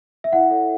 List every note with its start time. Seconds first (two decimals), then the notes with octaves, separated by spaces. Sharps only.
0.24 E5
0.32 E4 F#5
0.51 A4 C#5